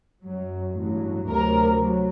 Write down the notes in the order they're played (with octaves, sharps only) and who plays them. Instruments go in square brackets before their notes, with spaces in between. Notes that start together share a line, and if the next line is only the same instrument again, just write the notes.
[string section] F#2 F#3
A1 G2 F#3
D2 C3 F#3 A#4
F#3